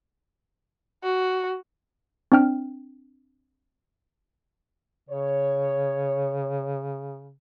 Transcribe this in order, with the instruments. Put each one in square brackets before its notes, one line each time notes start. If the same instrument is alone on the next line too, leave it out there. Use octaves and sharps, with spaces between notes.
[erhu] F#4
[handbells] C4 D4 G5 F6
[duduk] C#3 [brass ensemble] C#5